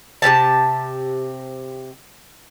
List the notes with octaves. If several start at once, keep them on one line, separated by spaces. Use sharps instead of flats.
C3 C#4 G4 A5